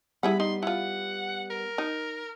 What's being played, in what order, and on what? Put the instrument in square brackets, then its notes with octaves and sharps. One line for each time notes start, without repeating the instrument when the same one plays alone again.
[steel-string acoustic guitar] G3 B3 [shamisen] E4 G#4 F#5 [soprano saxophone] B5
[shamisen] D#4 [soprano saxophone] C6
[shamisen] E4 F4 [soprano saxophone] F#5
[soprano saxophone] A#4
[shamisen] D#4